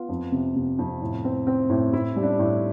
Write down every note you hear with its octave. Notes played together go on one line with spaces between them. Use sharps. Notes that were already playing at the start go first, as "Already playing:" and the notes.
Already playing: B3 F4
F2
C3
C3
F2
A2
C4
C4
A2
A2 E4
G3
D4
A2